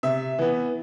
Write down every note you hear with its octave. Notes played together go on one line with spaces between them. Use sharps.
C3 E5
E3 B3